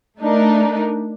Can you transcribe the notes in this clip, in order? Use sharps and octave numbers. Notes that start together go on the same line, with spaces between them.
A3 D4 D#4 A#4